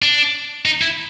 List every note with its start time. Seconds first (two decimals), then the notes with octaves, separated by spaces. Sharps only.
0.02 D4
0.65 D#4
0.81 E4